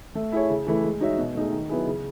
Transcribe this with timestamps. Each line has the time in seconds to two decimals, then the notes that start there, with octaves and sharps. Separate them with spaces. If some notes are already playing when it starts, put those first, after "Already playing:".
0.15 A3
0.32 E4 G#4 C#5
0.50 C#3
0.67 E3 A3 E4
0.84 G#3
1.01 D#4 F#4 C#5 E5
1.18 B2
1.35 A3 D#4 G#4
1.52 D#3
1.69 F#3 B3 E4 G#4
1.86 C#3